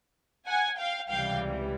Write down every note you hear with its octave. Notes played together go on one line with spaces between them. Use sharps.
F#5 G#5
F5 G5
C#2 C3 E3 G3 F5 G5